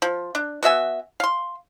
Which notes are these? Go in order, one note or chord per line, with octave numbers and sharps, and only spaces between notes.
F3
D4
B3 F#4 E5 G#5
F5 C6